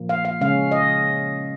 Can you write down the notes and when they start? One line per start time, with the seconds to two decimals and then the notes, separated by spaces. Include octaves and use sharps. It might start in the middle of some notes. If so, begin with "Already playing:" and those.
Already playing: A#2 F3 A#3
0.09 F5
0.25 F5
0.41 C#3 G#3 C#4 F5
0.72 D#5